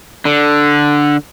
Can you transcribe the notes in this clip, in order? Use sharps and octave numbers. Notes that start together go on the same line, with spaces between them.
D3